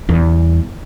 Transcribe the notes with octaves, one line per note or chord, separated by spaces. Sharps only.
E2 G3